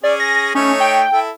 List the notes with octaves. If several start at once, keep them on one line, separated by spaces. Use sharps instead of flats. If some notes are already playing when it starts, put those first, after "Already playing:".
C#4 G#4 D5
A#6
A3 C#4 D#4 C#5
G5
E4 A4